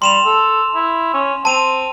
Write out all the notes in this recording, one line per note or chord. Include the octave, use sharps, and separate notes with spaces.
G3 C6 E7 F7
A4
E4
C#4
C4 A5 D#7 F7